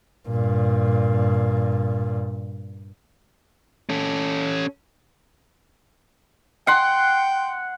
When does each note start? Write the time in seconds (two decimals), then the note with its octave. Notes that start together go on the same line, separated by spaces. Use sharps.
0.28 G2 A#2
3.89 C#4 A4
6.67 F#5 G5 C6